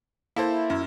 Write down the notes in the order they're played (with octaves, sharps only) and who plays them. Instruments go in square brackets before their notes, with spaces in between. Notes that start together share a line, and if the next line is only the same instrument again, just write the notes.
[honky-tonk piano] A#3 A4 C5 [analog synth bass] E4
[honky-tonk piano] F#2